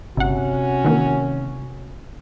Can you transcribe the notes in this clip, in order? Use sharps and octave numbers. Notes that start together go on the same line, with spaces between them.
G1 C3 C#4 F#4 F#5
D#3 E3 A#3